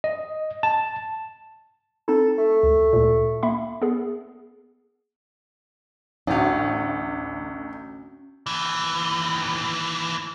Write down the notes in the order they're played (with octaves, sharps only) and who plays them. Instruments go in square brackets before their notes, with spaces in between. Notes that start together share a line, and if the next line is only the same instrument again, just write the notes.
[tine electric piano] D#5
A5
[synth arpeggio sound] C4 D#4 [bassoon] A4
[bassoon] A3
[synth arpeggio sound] D2
D2 A#2
A#3 E5 B5
B3 G#4
[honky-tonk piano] A1 D2 [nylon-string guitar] C#4 F5
[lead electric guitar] D#2 E3